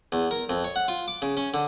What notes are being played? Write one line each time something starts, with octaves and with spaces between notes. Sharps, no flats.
E2
A#4
F2
C#5
F#5
F4
D6
C#3
C#4
D3